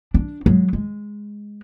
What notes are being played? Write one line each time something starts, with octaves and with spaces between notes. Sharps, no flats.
D4
F#3 G#3
G#3